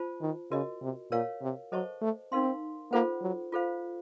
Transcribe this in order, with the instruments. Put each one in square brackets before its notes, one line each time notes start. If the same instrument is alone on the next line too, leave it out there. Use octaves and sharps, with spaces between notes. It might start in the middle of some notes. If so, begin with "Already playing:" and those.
Already playing: [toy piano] F4 C5 A5
[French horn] D#3
[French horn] C#3 [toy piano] F#4 A#4 D#5
[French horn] C3
[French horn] A#2 [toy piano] A#4 C#5 F5
[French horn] C3
[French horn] F#3 [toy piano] A4 C5 D#5 A5 C#6
[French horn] A3
[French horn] C4 [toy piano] D#4 A#4 F5 C6
[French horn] A#3 [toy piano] F4 A4 C5 F#5
[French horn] F#3
[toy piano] F4 A4 C5 F5